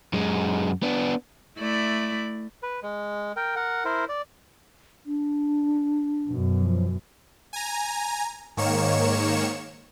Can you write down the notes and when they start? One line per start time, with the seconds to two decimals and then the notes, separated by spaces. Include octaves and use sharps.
0.13 F#2 G#3
0.82 B3 D4
1.59 A3 E4 D5
2.63 B4
2.83 G#3
3.36 A#4 G5
3.56 A#4 F#5
3.85 E4 A#4 C5
4.09 D5
5.06 D4
6.27 F#2 B2
6.60 F3
7.53 G#5 A#5
8.57 G#2 D#3 A#3 C#5 C#7 E7